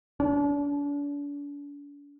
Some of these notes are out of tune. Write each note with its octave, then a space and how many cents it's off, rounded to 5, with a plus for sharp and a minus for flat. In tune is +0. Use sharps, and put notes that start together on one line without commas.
D4 -40